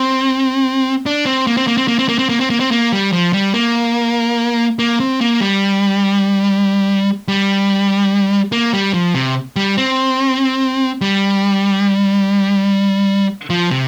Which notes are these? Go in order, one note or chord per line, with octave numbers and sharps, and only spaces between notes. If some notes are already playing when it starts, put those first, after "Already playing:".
Already playing: C4
D4
C4
A#3
C4
A#3
C4
A#3
C4
A#3
C4
A#3
C4
A#3
C4
A#3
G3
F3
G3
A#3
A#3
C4
A#3
G3
G3
A#3
G3
F3
C3
G3
C4
G3
F3
C3